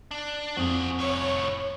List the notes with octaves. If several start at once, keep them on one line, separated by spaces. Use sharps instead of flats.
D4
F2 F#4 G#4
C2 A2 C#5